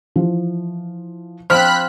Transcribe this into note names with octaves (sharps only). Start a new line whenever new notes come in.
E3 F3
F3 C4 C5 B5 F6 F#6 B6